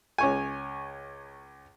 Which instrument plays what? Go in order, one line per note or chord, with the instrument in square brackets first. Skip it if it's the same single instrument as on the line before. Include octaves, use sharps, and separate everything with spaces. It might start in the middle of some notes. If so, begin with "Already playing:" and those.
[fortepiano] C#2 C#5 G#5